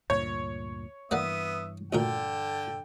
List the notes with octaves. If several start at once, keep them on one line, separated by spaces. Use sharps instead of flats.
D2 G2 A#2 C#5
G2 E3 A#3 B3 D5 E5 F#5 D#6
D2 A#2 D3 A4 A#4 G5